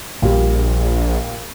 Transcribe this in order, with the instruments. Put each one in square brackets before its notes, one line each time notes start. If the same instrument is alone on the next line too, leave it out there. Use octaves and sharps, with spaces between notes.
[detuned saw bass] A#1 [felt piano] A#2 G3